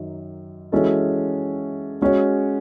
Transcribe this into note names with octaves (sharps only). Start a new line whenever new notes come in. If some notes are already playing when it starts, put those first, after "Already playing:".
Already playing: F#2 D#3 F#3
E3 G#3 C#4 F#4 A4
G#3 C#4 F#4 C#5